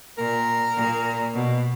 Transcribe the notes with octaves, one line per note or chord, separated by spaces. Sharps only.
A#2 A#4
A#2
B2